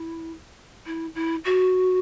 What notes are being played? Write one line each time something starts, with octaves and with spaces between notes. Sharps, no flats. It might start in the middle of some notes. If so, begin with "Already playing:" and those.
Already playing: E4
E4
E4
F#4